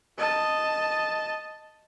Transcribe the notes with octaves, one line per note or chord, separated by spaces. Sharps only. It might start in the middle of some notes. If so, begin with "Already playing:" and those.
D#5 A5